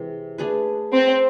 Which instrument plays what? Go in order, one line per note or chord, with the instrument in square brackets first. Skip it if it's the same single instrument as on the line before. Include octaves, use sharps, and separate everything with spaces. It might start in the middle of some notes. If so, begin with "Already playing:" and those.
Already playing: [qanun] C3 E3 G#3
A3 D4 G#4 B4
[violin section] C4